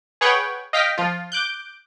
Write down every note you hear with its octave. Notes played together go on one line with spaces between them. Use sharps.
G#4 B4 C#5 F#5 G5
D#5 F5 G5 A#6 B6
F3 F4
D6 F#6 G6